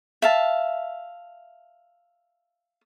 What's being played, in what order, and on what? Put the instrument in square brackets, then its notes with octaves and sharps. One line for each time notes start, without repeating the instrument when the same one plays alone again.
[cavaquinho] E5 F5 A5